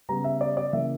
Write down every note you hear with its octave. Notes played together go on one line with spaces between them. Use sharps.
C#3 G3 B3 A#5
E5
D5
D5
C#3 E3 A#3 E5